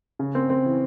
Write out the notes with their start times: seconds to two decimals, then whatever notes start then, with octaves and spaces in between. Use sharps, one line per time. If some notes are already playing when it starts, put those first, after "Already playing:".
0.19 C#3
0.35 C4
0.50 C4
0.65 E3